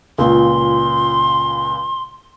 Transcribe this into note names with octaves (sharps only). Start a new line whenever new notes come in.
C#2 A#2 C6